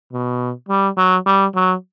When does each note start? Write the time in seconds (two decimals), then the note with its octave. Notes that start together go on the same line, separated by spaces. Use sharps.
0.13 B2
0.69 G3
0.97 F#3
1.26 G3
1.55 F#3